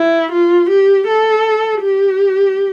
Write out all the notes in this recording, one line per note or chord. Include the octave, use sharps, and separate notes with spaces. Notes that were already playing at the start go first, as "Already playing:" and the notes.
Already playing: E4
F4
G4
A4
G4